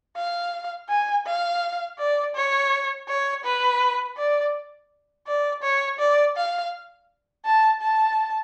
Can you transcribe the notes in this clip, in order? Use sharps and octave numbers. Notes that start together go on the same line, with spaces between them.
F5
G#5
F5
D5
C#5
C#5
B4
D5
D5
C#5
D5
F5
A5
A5